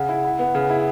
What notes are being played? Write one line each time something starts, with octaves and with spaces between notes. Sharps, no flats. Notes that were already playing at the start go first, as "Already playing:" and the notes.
Already playing: C#3 F#5
E4
E4
B3
C#3
E4